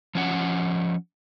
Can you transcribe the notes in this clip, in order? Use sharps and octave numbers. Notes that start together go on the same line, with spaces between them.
F3 C#4 F#5